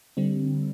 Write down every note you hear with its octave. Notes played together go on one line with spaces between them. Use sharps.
D3 G3 C4